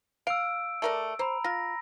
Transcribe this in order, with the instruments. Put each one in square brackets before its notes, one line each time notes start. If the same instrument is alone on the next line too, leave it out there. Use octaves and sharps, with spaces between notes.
[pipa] F5 [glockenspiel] E6 D7
[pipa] A3 A#4 D5
[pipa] C5 [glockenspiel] A#5 B5
[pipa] F4 [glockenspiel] A#6